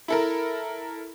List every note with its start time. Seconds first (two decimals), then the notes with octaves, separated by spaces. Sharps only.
0.08 E4 A4 A#4